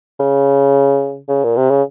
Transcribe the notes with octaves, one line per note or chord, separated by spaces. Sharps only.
C#3
C#3
A#2
C3
C#3